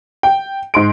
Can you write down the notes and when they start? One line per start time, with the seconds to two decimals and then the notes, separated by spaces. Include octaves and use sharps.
0.23 G5
0.74 G#2 C6 D7